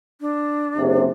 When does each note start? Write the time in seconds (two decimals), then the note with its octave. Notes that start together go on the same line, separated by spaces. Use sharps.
0.21 D4
0.78 F#1 C3